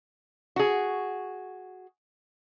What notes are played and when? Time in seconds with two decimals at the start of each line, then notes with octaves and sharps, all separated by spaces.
0.56 F#4 G#4